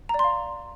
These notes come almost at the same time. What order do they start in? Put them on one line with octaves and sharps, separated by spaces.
A#5 D5 C6 F5